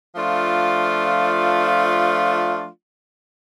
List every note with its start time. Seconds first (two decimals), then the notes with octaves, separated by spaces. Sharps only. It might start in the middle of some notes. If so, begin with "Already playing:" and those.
0.16 F3 A3 D4 F4